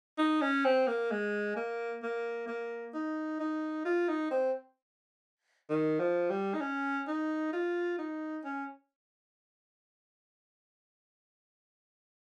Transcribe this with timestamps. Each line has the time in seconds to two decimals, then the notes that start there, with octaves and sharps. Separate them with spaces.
0.18 D#4
0.41 C#4
0.65 C4
0.87 A#3
1.11 G#3
1.56 A#3
2.03 A#3
2.47 A#3
2.94 D#4
3.40 D#4
3.85 F4
4.08 D#4
4.31 C4
5.69 D#3
6.00 F3
6.30 G3
6.54 D#4
6.61 C#4
7.08 D#4
7.53 F4
7.98 D#4
8.45 C#4